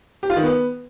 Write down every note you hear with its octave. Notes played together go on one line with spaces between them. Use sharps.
G4
F4
D#3
B3